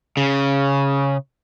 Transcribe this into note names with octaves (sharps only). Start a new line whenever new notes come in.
C#3